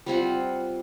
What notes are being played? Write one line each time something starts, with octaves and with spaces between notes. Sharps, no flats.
G3 C4 F4 F#5